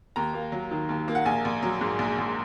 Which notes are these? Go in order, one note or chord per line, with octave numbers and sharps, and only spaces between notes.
D#2 A#5
A#3
F#3
D#3
D#2
A#3
F#5
A#1 G#5
A#1
F#3
G#2
A#1
A#1